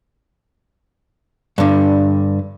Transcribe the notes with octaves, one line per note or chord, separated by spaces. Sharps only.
G2 D3